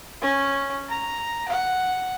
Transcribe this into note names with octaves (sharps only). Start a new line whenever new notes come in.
C#4
A#5
F#5